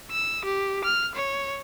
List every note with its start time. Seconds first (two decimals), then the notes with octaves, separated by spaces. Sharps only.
0.11 E6
0.45 G4
0.84 F6
1.15 C#5